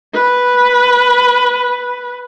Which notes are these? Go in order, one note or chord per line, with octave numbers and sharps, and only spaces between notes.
B4